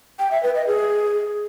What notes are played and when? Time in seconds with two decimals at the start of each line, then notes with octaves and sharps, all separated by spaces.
0.19 G5
0.31 E5
0.43 B4
0.55 D#5
0.67 G#4